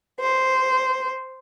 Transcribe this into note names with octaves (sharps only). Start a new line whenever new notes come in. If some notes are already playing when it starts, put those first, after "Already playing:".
C5